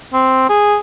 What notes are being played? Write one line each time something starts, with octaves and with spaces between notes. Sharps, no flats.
C4
G#4